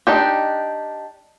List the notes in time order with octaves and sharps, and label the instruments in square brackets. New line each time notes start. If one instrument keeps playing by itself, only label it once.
[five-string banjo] D4 D#4 G4